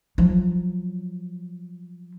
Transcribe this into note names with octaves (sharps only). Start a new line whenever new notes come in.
F3 F#3